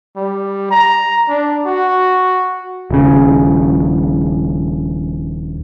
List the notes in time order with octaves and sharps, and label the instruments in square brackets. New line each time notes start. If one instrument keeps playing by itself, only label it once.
[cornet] G3
A#5
D4
F#4
[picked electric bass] D#1 C#3